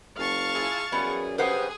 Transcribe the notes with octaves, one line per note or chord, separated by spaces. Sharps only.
F#1 F5 A5 C#6
E4 F4 G#4
F#2 E3 G3 B3 G#4
G2 C#3 G4 G#4 B4 C5 F#5